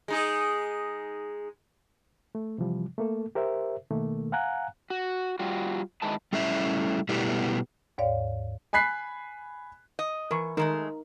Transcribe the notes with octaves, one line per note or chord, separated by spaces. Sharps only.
G#3 D#4 G#4
A3
C3 E3 F3 G3
A3 A#3 A4
G4 A#4 C5 E5
B2 D#3 A3 A#3
F5 F#5 G#5 A#5 F#6
F#4
G3 F4 F#4
G#2 D#3 G#3 E4 B4 A5
G3 A3 C#4 E4 E5
B2 G3 A3 B3 E4 G4
D#2 G#2 C#5 D5 F5
G#5 B5 F#6 B6 C7
D#5
E3 A#4 C#6
D#3 G#3 A3 D#4 A#4